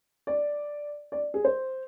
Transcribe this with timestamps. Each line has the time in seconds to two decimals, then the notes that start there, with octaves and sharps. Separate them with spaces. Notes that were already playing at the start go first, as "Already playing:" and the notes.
0.27 D5
1.12 D5
1.34 G#4
1.45 C5